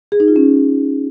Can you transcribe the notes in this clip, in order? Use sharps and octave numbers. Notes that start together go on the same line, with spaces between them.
G#4
D#4
F4
C#4